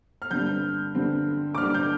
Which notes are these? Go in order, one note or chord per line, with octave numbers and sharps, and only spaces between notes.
F6
G2 D3 G3 C4 G6
G2 D3 G3 C4
D6
G2 D3 G3 C4 F6
G6